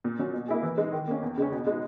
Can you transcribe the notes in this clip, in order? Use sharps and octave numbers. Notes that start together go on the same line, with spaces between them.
A#2
F#3 C#4
B2
A#3 E4 G#4
E3
G#3 D#4
D#3
A#3 C#4
E2
C#3 G#3 C#4
B2
G#3 D#4